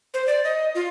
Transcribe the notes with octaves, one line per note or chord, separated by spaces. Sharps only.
C5
D5
D#5
F4